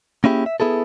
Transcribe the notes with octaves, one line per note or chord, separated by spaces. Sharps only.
A#3 C#4 E4 G4 G#4
E5
B3 E4 G#4 A4